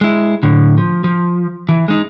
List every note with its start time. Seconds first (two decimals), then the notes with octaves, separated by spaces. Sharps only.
0.01 G#3 E4
0.43 A2 D3
0.78 F3
1.04 F3
1.69 E3
1.88 G#3 D#4